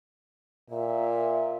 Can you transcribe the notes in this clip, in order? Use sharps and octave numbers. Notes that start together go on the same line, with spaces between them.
A#2 E5